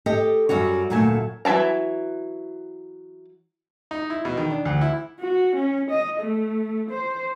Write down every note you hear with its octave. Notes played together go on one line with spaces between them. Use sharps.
G4 A4 D#5
F#2 G3 F#4 C#5
D2 A#2 F#3 A3 G#5 A5
E3 F#3 E5 A5 A#5
D#4
E4
B2
D#3
D4
D2
E4
F#4
C#4
D#5
A3
C5